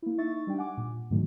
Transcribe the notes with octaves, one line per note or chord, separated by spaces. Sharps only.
A#3 E4
D#4 E5 C#6 A6
G3 D4 G5
F#5 G#5 D6
A#2
G#2 B2 D3 D#3 F#3 A3